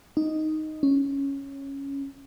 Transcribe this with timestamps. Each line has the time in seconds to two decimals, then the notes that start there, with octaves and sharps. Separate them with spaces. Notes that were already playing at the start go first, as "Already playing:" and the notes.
0.17 D#4
0.83 C#4